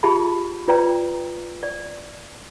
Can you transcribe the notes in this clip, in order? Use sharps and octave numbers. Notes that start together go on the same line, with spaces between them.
F4 G4 G#4 E5 A5 B5
F4 B4 C#5 D5 G5 A#5
D5